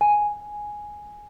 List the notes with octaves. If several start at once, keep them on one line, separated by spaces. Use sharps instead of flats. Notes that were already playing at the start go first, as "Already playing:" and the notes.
G#5